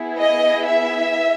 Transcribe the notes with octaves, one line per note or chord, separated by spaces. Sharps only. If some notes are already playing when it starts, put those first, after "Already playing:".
Already playing: B3 E4 G#4
D#5
E5